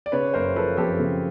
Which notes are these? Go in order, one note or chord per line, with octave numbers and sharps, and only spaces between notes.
D5
C#3 B4 C#5
F#1 A#4 C5
F3 A4 B4
F2 G4 A4
C#3